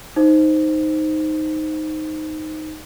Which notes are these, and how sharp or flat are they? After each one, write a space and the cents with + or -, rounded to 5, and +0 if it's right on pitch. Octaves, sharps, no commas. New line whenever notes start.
D#4 +0 C5 +0